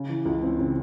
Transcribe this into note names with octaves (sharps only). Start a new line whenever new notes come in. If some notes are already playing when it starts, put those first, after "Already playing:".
Already playing: C#3
E3
C#2
C4
C#3